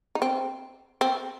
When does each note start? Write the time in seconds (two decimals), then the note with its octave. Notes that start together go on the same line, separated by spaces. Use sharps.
0.15 D#4
0.22 C4
1.01 C4